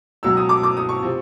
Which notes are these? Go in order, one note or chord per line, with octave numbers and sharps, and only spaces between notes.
C#2 B2 F#3 E6
D#6
D6
D6
D#6
C#6
C3 F3